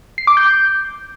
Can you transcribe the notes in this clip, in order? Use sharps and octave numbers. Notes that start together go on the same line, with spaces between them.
C7
D6
G6